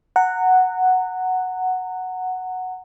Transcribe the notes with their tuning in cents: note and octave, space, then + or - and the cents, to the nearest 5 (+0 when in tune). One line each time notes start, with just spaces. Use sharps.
F#5 +0 A#5 -25